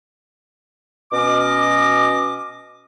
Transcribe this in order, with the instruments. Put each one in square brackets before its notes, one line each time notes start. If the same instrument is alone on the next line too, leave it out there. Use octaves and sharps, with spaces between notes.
[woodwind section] B2 C#4 D#5 D6